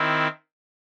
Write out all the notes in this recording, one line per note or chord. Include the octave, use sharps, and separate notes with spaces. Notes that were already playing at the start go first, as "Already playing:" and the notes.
Already playing: D#3 C4 E4